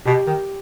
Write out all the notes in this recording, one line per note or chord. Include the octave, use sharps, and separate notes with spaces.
B2 G4
D#3